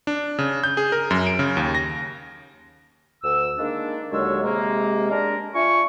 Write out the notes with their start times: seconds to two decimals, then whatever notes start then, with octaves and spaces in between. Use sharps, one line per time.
0.07 D4
0.39 C#3
0.64 G6
0.77 G#4
0.92 A#4
1.11 F#2
1.27 D7
1.39 C#3
1.57 D#2
1.75 A#6
3.23 D2 E6
3.58 D#3 G#3 A#3 D4
4.11 D#2 D3 F#3 G#3 C#5 E6
4.43 C3 G#3 A#3
5.10 G#3 D4 A#4
5.54 D4 F4 E5 G#5 C#6